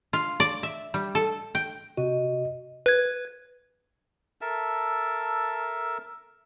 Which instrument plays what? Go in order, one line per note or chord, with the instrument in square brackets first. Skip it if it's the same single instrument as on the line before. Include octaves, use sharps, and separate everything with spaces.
[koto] F4
D5
E5
G3
A4
G5
[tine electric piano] C3 F#4 [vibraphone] D#5
[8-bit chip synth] B4 G#6
[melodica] A4 A#4 E5 A5